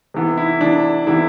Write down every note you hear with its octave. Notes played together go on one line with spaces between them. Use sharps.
C3 E3 B3
E4
C3 E3 B3 D4
C3 E3 B3 E4